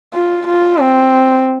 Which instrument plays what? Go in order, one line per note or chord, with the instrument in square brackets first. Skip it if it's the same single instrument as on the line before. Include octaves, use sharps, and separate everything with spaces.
[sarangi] F4
F4
C4